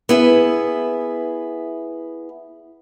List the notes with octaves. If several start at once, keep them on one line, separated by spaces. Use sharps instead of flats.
B3 E4 G#4